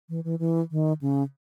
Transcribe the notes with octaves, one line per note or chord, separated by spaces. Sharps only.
E3
E3
E3
D#3
C#3